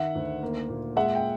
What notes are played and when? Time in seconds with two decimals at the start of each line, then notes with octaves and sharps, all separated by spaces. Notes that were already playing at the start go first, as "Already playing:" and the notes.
Already playing: D#3 E5 F#5
0.15 D2
0.42 A#3
0.69 A#2
0.96 G#3 E5 F#5
1.15 G5